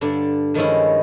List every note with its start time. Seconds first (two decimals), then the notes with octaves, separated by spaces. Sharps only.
0.01 G2 D3 D4
0.54 G2 D#3 F3 G#3 C#4 E4